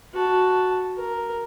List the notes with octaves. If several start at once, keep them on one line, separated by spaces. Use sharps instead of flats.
F#4 A5
A#4